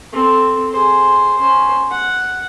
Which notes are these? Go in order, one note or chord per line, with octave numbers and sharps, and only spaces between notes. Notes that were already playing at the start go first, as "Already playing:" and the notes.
C4 A4
G#4 C5
C#4 C5
F#5